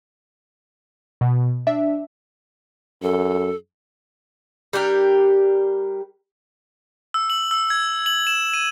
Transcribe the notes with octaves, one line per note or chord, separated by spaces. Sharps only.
B2
D4 E5
F#2 A4
G3 D4 G4 A#4
E6
F#7
E6
G#6
F#7
E7
D#7